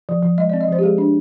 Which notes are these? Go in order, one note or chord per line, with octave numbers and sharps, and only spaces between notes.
F3
F3
G#3 D#5
D5
C4
D#5
F3 C5
G4
G#3 G#4
D4